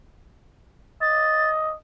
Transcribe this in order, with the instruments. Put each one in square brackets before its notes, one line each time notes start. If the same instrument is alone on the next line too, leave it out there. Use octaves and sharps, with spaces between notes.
[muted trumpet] D#5 [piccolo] A6